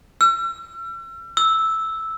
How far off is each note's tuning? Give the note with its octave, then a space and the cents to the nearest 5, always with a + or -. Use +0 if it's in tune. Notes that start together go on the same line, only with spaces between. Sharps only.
E6 +40
E6 -5